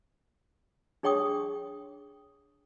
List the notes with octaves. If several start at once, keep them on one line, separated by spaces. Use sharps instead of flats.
D4 G#4 C#5 G5 C#6 D#6